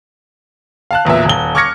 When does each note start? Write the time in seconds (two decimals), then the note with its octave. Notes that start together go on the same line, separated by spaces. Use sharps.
0.91 F5 A5 F#6
1.05 B1 E2 A#2 E5
1.25 D#1 G7
1.55 C#6 D6 F6 G#6 A#6 C#7